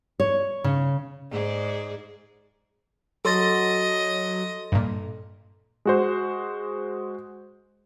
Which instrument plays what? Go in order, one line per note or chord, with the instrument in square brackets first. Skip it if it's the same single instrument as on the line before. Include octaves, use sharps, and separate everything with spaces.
[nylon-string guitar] C#5
C#3
[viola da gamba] G#2 G#4 D5
[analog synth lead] F#3 [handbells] A4 C6 A6 [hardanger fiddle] D#5
[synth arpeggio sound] G2 A#2
[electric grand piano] G#3 F#4 C5